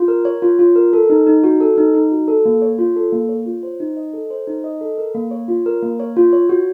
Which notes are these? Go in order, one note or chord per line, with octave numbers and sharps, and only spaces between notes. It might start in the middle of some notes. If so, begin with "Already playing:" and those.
Already playing: F4
A#4
C#5
F4
F4
A#4
A4
D#4
D#4
F#4
A4
D#4
D#4
F#4
A4
A#3
C#5
F4
A4
A#3
C#5
F4
C5
D#4
D#5
A4
C5
D#4
D#5
A4
A#4
A#3
C#5
F4
A#4
A#3
C#5
F4
C#5
F#4